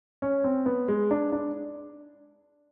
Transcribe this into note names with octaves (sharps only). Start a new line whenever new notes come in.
C#4
C4
B3
G#3
D4
D4